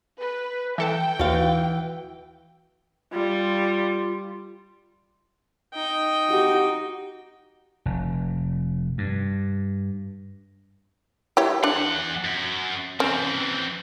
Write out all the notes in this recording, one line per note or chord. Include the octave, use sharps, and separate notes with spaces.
B4
E3 A4 G5 A5
D#2 E3 F#4 F5
G3 F4
D#4 G5
F#4 G4
F1
G2
E4 G4 C#5
E2 D4 F#5
F#2
E3 C4 C#4